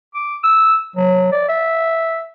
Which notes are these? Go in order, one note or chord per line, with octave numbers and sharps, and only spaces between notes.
D6
E6
F#3
D5
E5